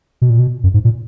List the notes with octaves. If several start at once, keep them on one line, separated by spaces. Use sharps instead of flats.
B2
A#2
B2
F#2
G#2
A#2